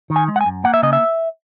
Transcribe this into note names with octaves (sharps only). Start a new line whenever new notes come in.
D#3
G#5
G#3
F#5
G#5
F#2
A#3 F#5
E5
C#3 D#5
E5